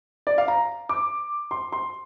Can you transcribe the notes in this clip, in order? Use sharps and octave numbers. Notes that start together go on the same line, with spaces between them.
D5
F5
A#5
D6
C6
C6